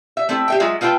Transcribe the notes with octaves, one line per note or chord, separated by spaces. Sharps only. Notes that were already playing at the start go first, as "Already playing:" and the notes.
E5
A3 C4 E4 A4
G4 E5 G5
F#3 G#3 F4 G#4 E5
A3 F4 B4 G5 A5